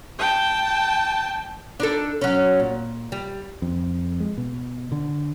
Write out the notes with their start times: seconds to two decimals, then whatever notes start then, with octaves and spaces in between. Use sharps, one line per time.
0.19 G5 A5
1.80 D4 D#4 A4
2.21 F#3 C#4
2.60 A#2
3.12 G3
3.62 F2
4.20 G#3
4.37 B2
4.92 D3